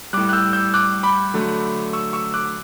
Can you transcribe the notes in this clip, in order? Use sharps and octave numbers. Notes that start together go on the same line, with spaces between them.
A2 G3 D6 F#6
F#6
E6 G6
E6 G6
D6 F#6
B5 D6
D3 F#3 A3
C#6 E6
C#6 E6
D6 F#6